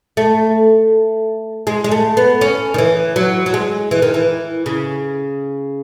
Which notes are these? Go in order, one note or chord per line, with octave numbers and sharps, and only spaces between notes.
A3
G#3
G#3
A3
B3
C#4
D#3
E3
F#3
F#3
G#3
E3
D#3
E3
C#3